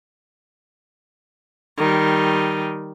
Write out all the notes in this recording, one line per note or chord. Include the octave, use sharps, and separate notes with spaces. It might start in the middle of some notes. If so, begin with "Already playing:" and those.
D#3 G3